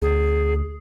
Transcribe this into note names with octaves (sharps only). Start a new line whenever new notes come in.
D2 G#4